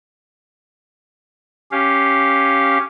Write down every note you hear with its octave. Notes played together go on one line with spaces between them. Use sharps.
C#4 G4 F5